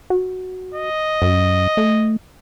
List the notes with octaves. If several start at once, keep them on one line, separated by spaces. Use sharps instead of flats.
F#4
D#5
F#2
A3